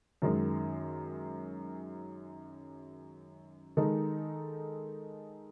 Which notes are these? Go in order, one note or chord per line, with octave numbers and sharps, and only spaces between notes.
F#2 D#3 G#3
D#3 G#3 D#4 A4